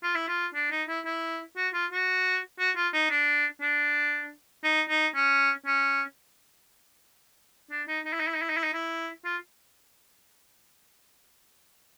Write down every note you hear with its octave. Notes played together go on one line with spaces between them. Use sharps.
F4
E4
F4
D4
D#4
E4
E4
F#4
F4
F#4
F#4
F4
D#4
D4
D4
D#4
D#4
C#4
C#4
D4
D#4
D#4
E4
D#4
E4
D#4
E4
D#4
E4
D#4
E4
F4